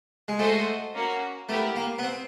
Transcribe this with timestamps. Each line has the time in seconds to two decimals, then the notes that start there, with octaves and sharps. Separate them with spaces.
0.28 G#3
0.39 A3 F#4 A4 C5 D#5
0.94 A#3 C#4 F#4
1.48 A3 B3 E4 G4 A#4
1.76 A#3
1.98 B3
2.03 C4